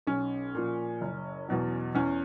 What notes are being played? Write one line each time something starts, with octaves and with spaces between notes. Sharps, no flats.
B1 C#4
A#2 F3
F#1
E2 B2 F#3
E2 C#4